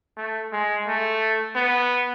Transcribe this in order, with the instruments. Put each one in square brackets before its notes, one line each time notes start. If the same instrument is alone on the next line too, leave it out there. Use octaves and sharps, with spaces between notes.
[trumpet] A3
G#3
A3
B3